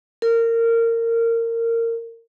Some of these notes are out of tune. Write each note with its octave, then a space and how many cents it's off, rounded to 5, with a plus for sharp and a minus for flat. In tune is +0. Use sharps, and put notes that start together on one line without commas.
A#4 -20